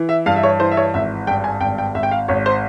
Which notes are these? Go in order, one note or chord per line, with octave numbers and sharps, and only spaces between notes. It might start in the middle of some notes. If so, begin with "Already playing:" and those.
Already playing: E3
E5
G2 F5
E5
C#5
E3 C5
E5
C#5
G#1 E5
G2 G5
G#5
G#1 G5
G5
G#1 E5
G5
F5
G#1 C#5
C5